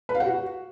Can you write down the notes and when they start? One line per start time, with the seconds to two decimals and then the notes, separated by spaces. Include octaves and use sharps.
0.09 B4
0.15 F5
0.20 F#5
0.26 F#4